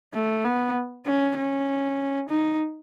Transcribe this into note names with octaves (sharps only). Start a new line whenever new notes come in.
A3
B3
C#4
C#4
D#4